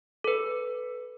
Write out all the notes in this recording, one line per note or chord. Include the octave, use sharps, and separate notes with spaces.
A4 B4